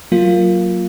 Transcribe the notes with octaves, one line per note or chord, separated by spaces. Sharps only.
F#3 A#3 F4